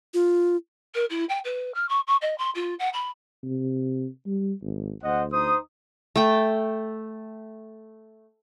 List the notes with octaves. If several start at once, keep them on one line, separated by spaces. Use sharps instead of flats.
F4
A#4
E4
G5
B4
F6
C#6
C#6
D#5
C6
F4
F#5
B5
C3
G3
G#1
D2 C5 D#5 F#5
D#4 C5 D#6
A3 G5